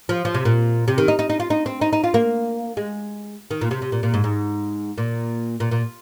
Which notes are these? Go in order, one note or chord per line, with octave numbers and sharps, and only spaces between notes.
F3
F3
C3
A#2
C3
D#3
D#4
D#4
D#4
F4
D#4
C4
D#4
D#4
F4
A#3
G#3
D#3
A#2
C3
C3
A#2
A#2
G#2
G#2
A#2
A#2
A#2